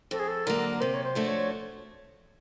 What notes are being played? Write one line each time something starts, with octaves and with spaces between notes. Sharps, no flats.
F2 A4
G#4
A4
D3 F#3 A#3 A#4
C3 C5
C#5
C5
F3 A3 D4 F#4
C#5